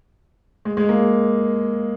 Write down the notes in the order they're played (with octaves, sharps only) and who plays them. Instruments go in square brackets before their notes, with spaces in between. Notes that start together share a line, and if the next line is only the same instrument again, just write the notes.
[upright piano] G#3
G#3
A#3